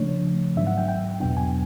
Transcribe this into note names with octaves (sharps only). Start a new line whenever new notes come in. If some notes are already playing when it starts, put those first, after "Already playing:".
Already playing: C#3 F3 A3 D4 C#5
G#2 D#3 F#3 B3 D4 E5
F#5
G5
G5
E2 B2 F#3 B3 D4 G5
G#5